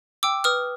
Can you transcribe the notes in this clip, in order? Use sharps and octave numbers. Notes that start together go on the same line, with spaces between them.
G5 D6 E6
B4 D#6 F6